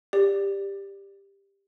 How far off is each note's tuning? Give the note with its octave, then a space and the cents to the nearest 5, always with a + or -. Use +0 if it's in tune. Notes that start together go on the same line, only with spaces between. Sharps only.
G4 +15 D5 +0